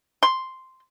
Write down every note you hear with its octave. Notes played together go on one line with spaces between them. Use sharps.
C6